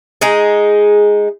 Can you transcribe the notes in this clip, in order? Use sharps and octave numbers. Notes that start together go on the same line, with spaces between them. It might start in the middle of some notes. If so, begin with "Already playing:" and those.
G#3 D#4 G#4